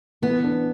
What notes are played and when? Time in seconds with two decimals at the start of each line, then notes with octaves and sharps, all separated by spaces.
0.22 E3 B3
0.44 D4